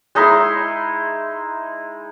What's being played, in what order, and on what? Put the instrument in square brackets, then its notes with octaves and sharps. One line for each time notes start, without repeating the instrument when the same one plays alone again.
[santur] G#3 D#4 E4 C6